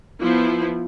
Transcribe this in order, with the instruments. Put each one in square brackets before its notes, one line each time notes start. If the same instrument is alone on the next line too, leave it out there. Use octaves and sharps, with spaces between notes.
[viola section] F3 B3 E4 [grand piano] F4